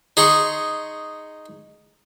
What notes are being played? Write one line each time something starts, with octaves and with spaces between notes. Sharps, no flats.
D#4 G#4 C6 C#6